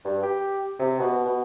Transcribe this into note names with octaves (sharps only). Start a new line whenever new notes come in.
G2
G4
C3
B2
B2